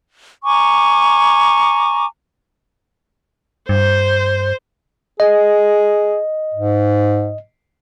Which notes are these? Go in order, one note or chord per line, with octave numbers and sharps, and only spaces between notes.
G#5 A#5 C#6 D6
G2 C5
G#4 D#5
G#2